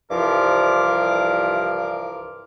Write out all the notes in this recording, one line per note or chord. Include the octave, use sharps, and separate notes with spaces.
C2 G2 E3 F3 A#4 D6